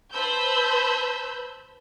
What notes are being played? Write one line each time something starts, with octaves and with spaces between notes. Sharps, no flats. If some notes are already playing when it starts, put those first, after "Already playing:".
B4 C5 A5 B5 E6 G6